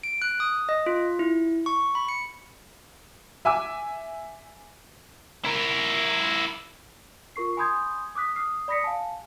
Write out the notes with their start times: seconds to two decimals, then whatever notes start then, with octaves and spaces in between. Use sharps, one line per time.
0.03 D7
0.22 F#6
0.40 D#6
0.69 D#5
0.86 F4
1.19 E4
1.66 C#6
1.95 B5
2.09 C#7
3.45 E5 G#5 D6 E6
5.45 E4 A#4
7.36 F4 A#4 C#6 C7
7.57 G#5 B5 C6 D#6 G6 G#6
8.15 D6 D#6 F#6 B6
8.36 D#6 F6 C7
8.68 D5 B5 D#6 A#6 B6 C#7
8.84 F5 G#5 A5